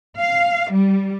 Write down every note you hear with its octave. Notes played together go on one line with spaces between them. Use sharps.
F5
G3